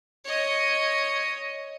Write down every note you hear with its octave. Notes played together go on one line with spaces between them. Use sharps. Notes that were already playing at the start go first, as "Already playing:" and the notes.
C#5 D#5